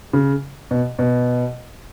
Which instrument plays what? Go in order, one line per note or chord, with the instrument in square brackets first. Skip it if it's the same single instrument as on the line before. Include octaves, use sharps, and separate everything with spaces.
[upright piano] C#3
B2
B2